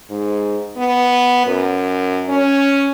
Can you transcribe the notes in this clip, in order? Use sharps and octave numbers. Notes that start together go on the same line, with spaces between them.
G#2
B3
F#2
C#4